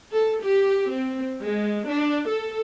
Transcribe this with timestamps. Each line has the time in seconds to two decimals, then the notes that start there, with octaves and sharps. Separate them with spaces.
0.13 A4
0.44 G4
0.90 C4
1.42 G#3
1.89 D4
2.27 A4